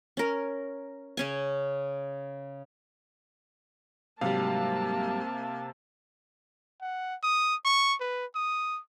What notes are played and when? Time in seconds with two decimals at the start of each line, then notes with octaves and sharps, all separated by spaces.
0.17 C#4 A#4
1.17 C#3 C#4 G#5
4.21 G#2 C3 F#3 G3 A#3 F5 A5
6.81 F#5
7.23 D#6
7.65 C#6
8.00 B4
8.35 D#6